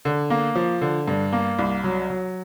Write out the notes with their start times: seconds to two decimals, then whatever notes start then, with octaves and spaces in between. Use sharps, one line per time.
0.05 D3
0.30 A#3
0.55 F3
0.81 D3
1.08 G2
1.33 A#3
1.59 C2
1.84 F#3
2.10 F#3